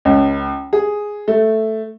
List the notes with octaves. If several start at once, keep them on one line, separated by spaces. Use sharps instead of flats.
C#2
G#4
A3